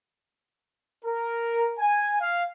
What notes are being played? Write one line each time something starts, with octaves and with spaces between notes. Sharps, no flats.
A#4
G#5
F5